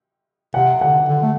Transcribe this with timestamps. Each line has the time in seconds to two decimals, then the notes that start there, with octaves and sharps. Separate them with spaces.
0.54 C3 F#5
0.81 D3 F#5
1.08 D3
1.23 A3